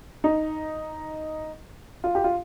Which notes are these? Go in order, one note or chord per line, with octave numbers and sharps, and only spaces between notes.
D#4
F4
G4
F4